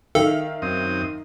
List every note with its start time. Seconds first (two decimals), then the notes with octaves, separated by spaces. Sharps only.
0.15 D#3 A4 E5 F5
0.62 F#2 C4 D#6